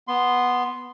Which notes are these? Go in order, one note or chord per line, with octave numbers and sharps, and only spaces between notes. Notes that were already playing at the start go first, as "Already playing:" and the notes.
B3 C6